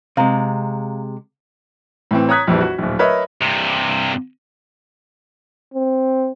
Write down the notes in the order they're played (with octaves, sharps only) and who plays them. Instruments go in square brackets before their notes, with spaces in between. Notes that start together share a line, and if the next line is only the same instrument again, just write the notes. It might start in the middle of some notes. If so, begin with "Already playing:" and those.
[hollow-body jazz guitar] C3 G#3 [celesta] F5 A#5
[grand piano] A2 E3 C4
C#5 A#5 D#6 F#6 G#6 B6
A#1 F2 E3 G3
F#4
D1 A#1
A#4 B4 C#5 D#5 E5
[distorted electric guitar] G2 C3
[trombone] C4